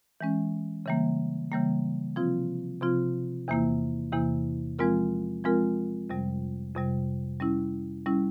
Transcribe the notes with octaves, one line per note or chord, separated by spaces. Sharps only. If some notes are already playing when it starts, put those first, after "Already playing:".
E3 G#3 C#4
C#3 E3 G3 A#3
C#3 E3 G3 A#3
C3 F3 C4 F4
C3 F3 C4 F4
E2 C3 E3 A#3 E4
E2 C3 E3 A#3 E4
F3 G#3 C4 F4 A#4
F3 G#3 C4 F4 A#4
F2 C3 G3
F2 C3 G3
G3 C#4 E4
G3 C#4 E4